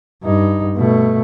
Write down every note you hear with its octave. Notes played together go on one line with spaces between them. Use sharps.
G2 D#4
B2 A3